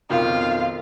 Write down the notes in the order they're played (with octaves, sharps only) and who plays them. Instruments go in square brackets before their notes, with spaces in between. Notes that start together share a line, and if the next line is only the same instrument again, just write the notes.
[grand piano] B1 F2 D#3 [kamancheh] F4 F5